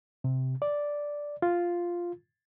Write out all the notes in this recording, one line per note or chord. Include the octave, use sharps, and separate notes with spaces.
C3
D5
F4